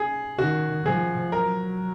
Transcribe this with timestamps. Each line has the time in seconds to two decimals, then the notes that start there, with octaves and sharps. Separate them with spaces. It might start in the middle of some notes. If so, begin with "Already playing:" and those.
Already playing: G#4
0.38 D#3 F#4
0.85 F3 G#4
1.32 F#3 A#4